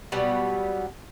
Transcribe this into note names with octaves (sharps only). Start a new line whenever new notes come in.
B2 F#3 G3 B3